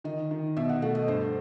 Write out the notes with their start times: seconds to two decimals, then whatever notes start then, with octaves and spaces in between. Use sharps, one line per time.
0.04 D#3 D#5
0.31 D#3
0.57 B2 E5
0.69 F#5
0.82 A3 F#5
0.95 D#5
1.08 G2 C5